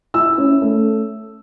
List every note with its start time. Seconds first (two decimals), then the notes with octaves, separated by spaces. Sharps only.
0.14 E4 E6
0.38 C#4
0.62 A3